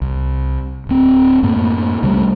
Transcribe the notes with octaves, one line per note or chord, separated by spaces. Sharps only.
C2
D1 C4
F#2 A2 A#3
C2 C#3 G3 A3